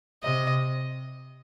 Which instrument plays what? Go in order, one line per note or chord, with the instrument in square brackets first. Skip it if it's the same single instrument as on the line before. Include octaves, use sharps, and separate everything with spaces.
[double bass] C3 [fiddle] D#5